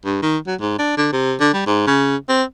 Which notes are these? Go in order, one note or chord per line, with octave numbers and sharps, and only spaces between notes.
G2
D#3
F#3
G#2
D4
D3
C3
D3
G3
G#2
C#3
C4